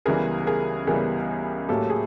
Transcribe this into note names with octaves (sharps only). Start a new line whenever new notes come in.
C#2 C#3 E3 G3 B3 G#4 A#4
G#4 A#4
C#2 C#3 E3 G3 B3 G#4 A#4
A2 F#3 A#3 G4 A4
G#4